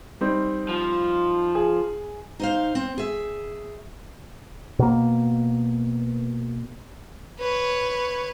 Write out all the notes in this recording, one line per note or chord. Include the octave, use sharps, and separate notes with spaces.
G3 C4 D#4
F3
G#4
D#4 C5 F5
C4
G#4 E5
B2 A#3
B4 C#5